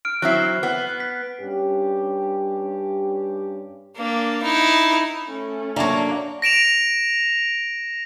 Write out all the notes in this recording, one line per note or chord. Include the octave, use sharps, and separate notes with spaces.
F6 D7
F#3 C4 E4 F#6 C7
B3
B6
G2 C#4 G4
A#3 D4
D#4 E4
A3 C#4
F#3 A#3 D4 E5 A5 C#6
A#6 D7 E7 F7